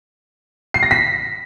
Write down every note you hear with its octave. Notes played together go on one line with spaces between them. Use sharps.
C7
A#6
B6